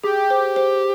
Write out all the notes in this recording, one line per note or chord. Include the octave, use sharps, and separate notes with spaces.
G4 G#4
C5
C5